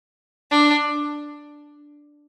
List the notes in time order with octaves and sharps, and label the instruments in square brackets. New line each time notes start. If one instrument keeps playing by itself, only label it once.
[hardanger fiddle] D4